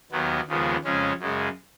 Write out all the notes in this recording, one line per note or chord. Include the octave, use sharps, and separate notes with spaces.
D#2 D#3 F#3 B3
D#2 C#3 F3 G#3 B3
F2 C#3 G#3 C#4
F#2 C#3 G#3